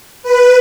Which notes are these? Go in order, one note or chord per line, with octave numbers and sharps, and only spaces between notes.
B4